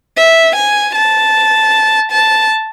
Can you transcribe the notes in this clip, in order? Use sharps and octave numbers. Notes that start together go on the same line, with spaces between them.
E5
G#5
A5
A5